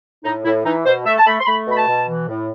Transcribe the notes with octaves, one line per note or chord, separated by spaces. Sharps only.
A2 D#4
A2 E4
E3 D#4
B2 C5
A3 E5
A5
A3 B5
C6
A3 B5
B2 B5
A5
B2
E3
A2